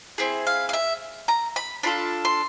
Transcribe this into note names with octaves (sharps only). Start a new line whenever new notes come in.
C4 E4 G#4
F5
F5
E5
A#5
B5
D4 F4 A4 B5
C6